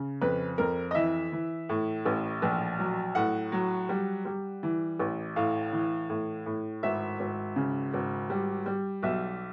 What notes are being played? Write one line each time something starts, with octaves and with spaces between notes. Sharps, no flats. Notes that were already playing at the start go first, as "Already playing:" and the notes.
Already playing: C#3
F2 B4
F2 A#4
D#5
E3 E5
E3
A2
A1
A#1
F#3
A2 F#5
F#3
G3
G3
E3
A1
A2 F5
E3
A2
A2
G#1 E5
G#1
C#3
G#1
G3
G3
B1 E5